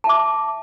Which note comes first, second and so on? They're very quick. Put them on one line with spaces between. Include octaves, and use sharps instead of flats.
A5 E5 D6